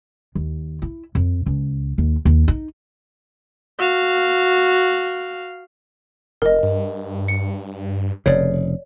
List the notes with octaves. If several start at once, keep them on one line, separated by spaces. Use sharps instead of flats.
D#2
E4
F2
C#2
D#2
D#2
D#4
F#4 F5
F1 A#4 D#5
G2
C#7
F1 C#3 C#5 D5